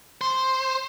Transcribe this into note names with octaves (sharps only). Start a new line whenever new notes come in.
C5